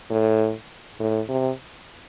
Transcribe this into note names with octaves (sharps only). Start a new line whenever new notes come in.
A2
A2
C3